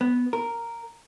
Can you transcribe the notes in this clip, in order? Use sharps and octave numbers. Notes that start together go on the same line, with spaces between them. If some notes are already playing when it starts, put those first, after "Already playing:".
B3
A#4